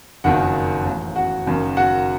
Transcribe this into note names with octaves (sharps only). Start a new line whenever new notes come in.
F#1 F2 D#3 F#4 F#5
A1 A2
F#4 F#5
F#1 F#2 D#3
F#4 F#5